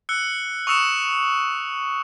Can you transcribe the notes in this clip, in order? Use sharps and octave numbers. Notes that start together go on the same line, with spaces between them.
E6 F#6 C#7 G7
C#6 D#6 E6 C#7 E7